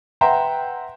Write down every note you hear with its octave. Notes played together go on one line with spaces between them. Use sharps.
B4 E5 F#5 G5 A#5 C6